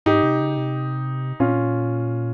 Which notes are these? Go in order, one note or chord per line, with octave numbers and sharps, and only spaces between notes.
G#2 D#4 G4
C3
C#3
C3
A#2 C#4 F4